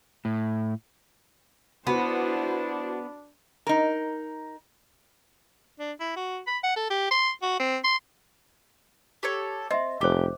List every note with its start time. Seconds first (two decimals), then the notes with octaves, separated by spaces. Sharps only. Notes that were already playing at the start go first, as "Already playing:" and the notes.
0.25 A2
1.87 B3 D4 E4 F#4 B4 C5
3.67 D#4 A#4
5.79 D4
6.00 E4
6.16 F#4
6.47 B5
6.63 F#5
6.76 A4
6.90 G4
7.11 C6
7.42 F#4
7.60 C4
7.84 C6
9.23 G4 A4 C#5
9.71 C4 D#5 E5
10.01 F1 G4 C5 D6